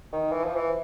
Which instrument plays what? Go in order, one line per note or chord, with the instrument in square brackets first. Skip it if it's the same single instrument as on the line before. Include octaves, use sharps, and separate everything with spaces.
[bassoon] D#3
E3
F3
E3